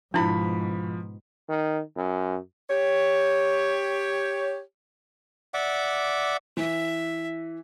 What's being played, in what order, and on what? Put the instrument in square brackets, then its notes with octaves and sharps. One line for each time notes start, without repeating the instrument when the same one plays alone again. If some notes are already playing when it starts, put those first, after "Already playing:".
[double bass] G#2 B2 [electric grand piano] F3 B5 [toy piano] D4 E4
[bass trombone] D#3
F#2
[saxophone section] G4 C#5
[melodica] D5 E5 F#5 D6
[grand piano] E3 [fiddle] E5